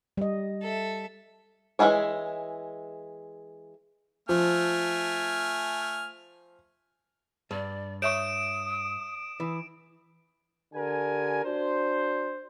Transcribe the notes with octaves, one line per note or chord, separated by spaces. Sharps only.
G3 D#5
A4 E5
E3 G#3 E4 G#4 C#5
F3 A3 G#5 F6
G2 D5
C#5 E5 C#6 D#6 D7 E7
E3
D3 G4 A#4 G#5
D4 F#4 C5